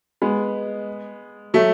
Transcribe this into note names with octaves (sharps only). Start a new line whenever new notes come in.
G#3 B3
F#3 A3